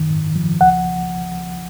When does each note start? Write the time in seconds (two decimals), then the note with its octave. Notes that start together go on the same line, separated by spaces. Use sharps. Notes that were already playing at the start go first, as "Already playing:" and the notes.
Already playing: F#2 D#3
0.10 G#2
0.35 F3
0.61 C#2 F#5